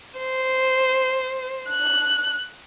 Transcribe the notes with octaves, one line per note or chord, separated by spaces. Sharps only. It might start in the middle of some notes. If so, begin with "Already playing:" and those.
C5
F#6